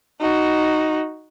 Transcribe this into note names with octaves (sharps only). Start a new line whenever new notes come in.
D#4 F#4